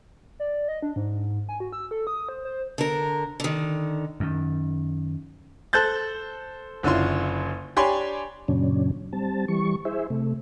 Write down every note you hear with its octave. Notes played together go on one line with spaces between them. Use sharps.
D5
D#5
D4
G#2
G#5
F#4
E6
A4
D#6
C5
C5
D3 A#4
D3 D#3
F#2 D#3
A4 C5 F#6 G6 A6
F#1 D3 C#4 E4 F4 C6
D4 G4 C#5 G#5 B5 C6
F#2 A#2 C#3 F#3 C#4 D4
G3 C4 A5
E3 G3 C#6
E4 G#4 C5 E5
C3 A3